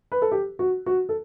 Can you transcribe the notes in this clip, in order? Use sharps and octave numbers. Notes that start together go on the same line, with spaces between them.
B4
A4
G4
F#4
F#4
A4